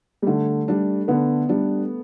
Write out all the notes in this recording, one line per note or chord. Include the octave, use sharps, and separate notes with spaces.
G3
D3 A3
G3 D4
D3 B3
G3 D4